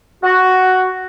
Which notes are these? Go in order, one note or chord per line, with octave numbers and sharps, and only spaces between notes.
F#4